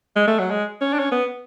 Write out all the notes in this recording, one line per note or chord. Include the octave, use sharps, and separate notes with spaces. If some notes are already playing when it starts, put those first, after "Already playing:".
G#3
A3
F#3
G#3
C#4
D4
C#4
B3